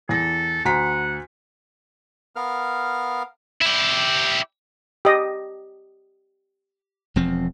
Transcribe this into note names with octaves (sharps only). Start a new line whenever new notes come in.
E2 A4 A#6
D2 F#5 A#5 B6
B3 A#4 F5 F6
E4 G4
G4 D#5
E1 F3 C4